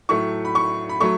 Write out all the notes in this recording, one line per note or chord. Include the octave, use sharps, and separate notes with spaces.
A2 F#3 A3 C#6
B5
C#6
B5
F#3 A3 C#6